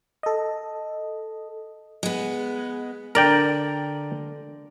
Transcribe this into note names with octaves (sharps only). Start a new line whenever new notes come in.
A4 D#5
G#3 B3
D3 A#4 D5 G5